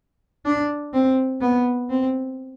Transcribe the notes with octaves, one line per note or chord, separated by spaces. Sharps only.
D4
C4
B3
C4